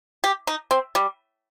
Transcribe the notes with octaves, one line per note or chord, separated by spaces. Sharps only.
G4
D#4
C4
G3